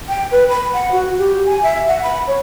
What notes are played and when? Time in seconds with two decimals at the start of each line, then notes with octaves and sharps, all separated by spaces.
0.08 G5
0.31 B4
0.49 B5
0.73 F#5
0.92 F#4
1.18 G4
1.46 G#5
1.63 E5
1.88 F#5
2.03 B5
2.27 C#5